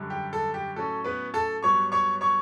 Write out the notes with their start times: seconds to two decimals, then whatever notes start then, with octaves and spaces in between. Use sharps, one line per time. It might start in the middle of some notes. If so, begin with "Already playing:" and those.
Already playing: F#2 D3 G3
0.10 G4
0.33 A4
0.54 G4
0.75 A2 F#3 C#4 A4
1.04 B3 B4
1.34 A4 A5
1.63 G2 F#3 B3 C#5 C#6
1.92 C#5 C#6
2.21 C#5 C#6